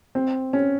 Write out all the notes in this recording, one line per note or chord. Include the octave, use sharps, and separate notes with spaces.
C4
C#4